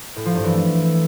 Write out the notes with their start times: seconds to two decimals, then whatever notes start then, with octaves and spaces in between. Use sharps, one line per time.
0.16 A2
0.26 F3
0.35 G2
0.44 E3
0.53 A3